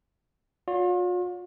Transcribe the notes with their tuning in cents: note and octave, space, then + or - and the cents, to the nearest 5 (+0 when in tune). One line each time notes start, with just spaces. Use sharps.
F4 +45 C#5 +45